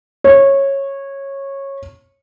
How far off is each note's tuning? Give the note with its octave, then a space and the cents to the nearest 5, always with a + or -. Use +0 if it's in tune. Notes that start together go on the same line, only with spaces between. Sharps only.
C#5 -15